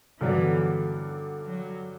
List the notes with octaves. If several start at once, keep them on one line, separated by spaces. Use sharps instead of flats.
G2 D3 E3 F#3 B3 D4
F#3